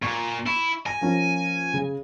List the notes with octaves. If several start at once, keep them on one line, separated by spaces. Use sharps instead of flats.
A#2 C#6
E4 C#6
G#5 A#6
F3 A#3 C#4
C#3